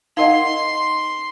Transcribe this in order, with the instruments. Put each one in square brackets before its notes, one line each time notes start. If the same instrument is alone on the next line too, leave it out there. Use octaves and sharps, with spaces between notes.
[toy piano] D#4 A#4 F#5 [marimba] D#5 F5 [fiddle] C6